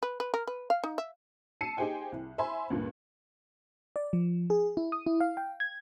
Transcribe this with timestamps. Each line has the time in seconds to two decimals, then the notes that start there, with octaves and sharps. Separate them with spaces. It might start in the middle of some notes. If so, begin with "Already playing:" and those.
0.03 B4
0.20 B4
0.34 A#4
0.47 B4
0.70 F5
0.84 D#4
0.98 E5
1.61 A5 E6 C7 C#7 D#7
1.77 D#4 G4 G#4 C5 G5 G#5
2.12 C2
2.38 C5 E5 G#5 B5 C6
2.70 C#2 G2 A#2
3.96 D5
4.13 F3
4.50 G#4
4.77 E4
4.92 D#6
5.06 E4
5.20 F5
5.37 G5
5.60 G#6